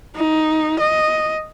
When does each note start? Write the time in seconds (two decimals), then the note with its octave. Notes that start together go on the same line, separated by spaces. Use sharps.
0.16 D#4
0.80 D#5